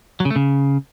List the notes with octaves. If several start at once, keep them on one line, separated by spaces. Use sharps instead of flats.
F#3
C#3
A3
C#3